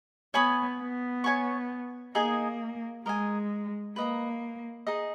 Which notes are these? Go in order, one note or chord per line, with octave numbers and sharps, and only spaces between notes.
B3 C#5 G#5 B5 D#6
B3
C#5 G#5 C#6
A#3 D#4 G#4 D#5 G#5
G#3 A#4 D#5 G#5
A#3 B4 D#5 A#5
D#4 G#4 D#5